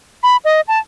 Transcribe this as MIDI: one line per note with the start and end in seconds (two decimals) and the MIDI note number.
0.23 0.37 83
0.45 0.61 75
0.68 0.79 81